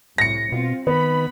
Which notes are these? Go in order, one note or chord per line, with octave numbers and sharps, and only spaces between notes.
C2 A2 A#6 C#7
B2 C4 F4
D#3 B3 B5